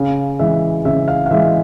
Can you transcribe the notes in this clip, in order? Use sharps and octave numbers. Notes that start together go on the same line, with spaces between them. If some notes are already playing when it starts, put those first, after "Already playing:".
Already playing: C#3 F5
E3 G#3 E5
C#3 E5
F5
F5
E3 G#3 E5